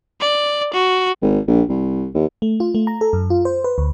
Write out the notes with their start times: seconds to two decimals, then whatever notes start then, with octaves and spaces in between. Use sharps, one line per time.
0.20 D5
0.73 F#4
1.22 G#1
1.47 A#1
1.69 C2
2.14 D#2
2.42 A3
2.60 F4
2.75 A3
2.87 A#5
3.01 A4
3.13 F#2
3.30 F4
3.45 C5
3.64 B4
3.78 D2